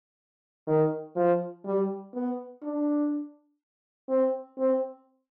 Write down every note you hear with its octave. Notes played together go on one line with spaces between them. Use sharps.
D#3
F3
G3
B3
D4
C4
C4